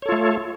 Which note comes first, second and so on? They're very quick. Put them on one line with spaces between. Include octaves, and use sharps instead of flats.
C#5 A4 F4 A3